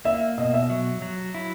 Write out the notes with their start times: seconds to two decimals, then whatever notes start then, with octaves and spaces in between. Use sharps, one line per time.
0.05 A#3 E5
0.38 B2 D#5
0.54 E5
0.70 F#3
1.02 F#3
1.35 E4